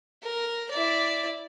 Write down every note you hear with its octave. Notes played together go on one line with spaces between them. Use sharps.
A#4
E4 D5